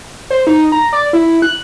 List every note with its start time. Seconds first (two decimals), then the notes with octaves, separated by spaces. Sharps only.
0.30 C5
0.47 D#4
0.72 A#5
0.93 D5
1.13 E4
1.42 F#6